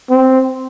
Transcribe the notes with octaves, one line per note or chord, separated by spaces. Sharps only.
C4